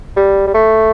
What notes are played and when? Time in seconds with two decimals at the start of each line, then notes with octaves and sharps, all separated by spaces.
0.16 G3
0.47 G3
0.54 A3